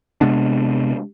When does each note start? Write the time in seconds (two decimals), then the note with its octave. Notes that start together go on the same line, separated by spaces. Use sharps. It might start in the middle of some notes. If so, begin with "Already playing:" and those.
0.21 C3 G#3 B3 D4